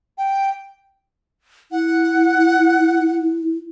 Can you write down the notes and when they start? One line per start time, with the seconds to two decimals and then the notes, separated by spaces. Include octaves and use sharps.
0.18 G5
1.72 E4 F#5